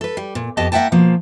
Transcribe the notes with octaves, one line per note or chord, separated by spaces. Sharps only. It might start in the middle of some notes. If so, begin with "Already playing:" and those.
A4 B4
G3
A#2
F2 B3 G4 D#5 A5
A#3 E4 E5 F#5 G5 A5
B2 F3 A#3